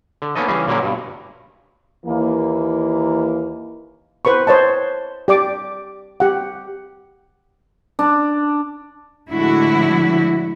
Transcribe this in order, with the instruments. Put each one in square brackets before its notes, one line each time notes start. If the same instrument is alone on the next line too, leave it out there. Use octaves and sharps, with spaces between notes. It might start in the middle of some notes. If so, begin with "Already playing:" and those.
[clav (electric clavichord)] D3
A#3 B3 C#4 D#4 A4 D#5
C#3 E3 G3 C#4 G#4
A#2 D3 F#3 A#3 C#4 A#4
G2 B2
[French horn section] D#2 E3 A#3
[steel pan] B4 C5 B5 C#6
C5 C#5 D#5 A5
G4 D5 D6
G4 F#5
[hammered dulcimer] D4
[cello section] A2 D3 F3 G#3 E4 F#4